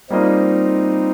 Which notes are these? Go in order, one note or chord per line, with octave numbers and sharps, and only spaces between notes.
G3 A#3 C4 D#4 F4 C5 D#5